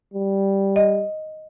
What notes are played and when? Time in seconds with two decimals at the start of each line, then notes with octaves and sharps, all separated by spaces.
0.14 G3
0.76 D#5